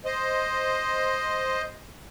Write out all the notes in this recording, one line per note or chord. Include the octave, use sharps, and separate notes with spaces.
C5 D#5